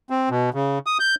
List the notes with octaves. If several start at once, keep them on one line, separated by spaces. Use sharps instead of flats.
C4
B2
C#3
D#6
G6